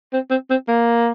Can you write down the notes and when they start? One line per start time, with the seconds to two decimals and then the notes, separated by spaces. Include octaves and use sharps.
0.13 C4
0.30 C4
0.50 C4
0.68 A#3